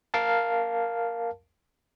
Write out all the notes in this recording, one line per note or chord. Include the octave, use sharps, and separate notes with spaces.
A#4 F5 A5